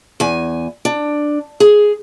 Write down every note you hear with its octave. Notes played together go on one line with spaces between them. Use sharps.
E2 G#5
D4
G#4